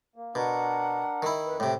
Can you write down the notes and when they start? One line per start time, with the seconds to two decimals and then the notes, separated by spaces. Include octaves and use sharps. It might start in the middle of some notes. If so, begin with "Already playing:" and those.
0.16 A#3
0.35 B2 D4 A#4 F#5
1.22 D#3 E4
1.46 F2 B4
1.60 A2 C3 G5